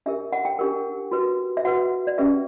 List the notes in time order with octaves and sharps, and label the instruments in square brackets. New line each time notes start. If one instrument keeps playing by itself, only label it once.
[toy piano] D4 G4 A#4 E5
F#5
G5
D4 G4 A#4
F#4 B4
E5
F#4 B4 F#5
D5
C#4 G4 B4 E5